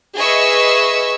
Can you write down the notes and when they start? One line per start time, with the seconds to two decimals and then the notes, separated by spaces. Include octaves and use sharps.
0.17 G#4 B4 D#5 E5 C#6 E6